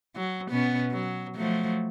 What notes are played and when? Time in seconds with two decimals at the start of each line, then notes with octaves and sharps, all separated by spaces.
0.15 F#3
0.50 B2 B3 C#4
0.91 F#3
1.36 F3 F#3 A3